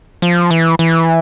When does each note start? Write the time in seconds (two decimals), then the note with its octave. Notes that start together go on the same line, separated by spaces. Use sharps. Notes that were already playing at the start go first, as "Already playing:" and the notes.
0.22 F3
0.51 E3
0.79 E3